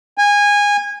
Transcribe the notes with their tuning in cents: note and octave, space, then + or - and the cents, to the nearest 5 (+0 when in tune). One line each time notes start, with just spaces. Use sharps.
G#5 -20